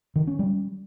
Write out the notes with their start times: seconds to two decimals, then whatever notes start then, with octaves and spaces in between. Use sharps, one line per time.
0.16 D#3
0.27 C#4
0.39 G3